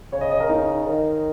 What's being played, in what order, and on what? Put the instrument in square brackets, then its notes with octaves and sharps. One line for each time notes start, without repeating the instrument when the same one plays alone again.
[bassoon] C#3 [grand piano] C#5
[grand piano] D#5
D#5
A#4
D#4
[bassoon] D#3